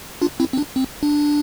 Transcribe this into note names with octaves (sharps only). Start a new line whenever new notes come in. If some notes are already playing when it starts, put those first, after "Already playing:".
D4 F4
C4 E4
C4
D4
C4
D4